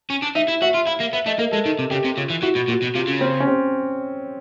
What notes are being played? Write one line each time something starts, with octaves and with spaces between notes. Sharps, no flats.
C#4
D4
D#4 E5
E4
F#4 E5
F4
E4 F5
A#3
B3 E5
A3 D#5
A#3 A#4
G#3 A4
D#3
C3
C#3 G4
C3
C#3 F4
E3
E3 F#4
B2
A#2 F#4
B2
C3 F4
C#3
C4
C#4
C4